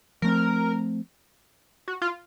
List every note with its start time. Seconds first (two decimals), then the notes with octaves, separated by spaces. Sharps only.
0.22 F3 A3 C4 A#4
1.88 F#4
2.02 F4